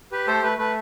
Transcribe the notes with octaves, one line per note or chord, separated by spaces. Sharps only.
G4 B4
A3 A4 C5
A3 B4
A3 B4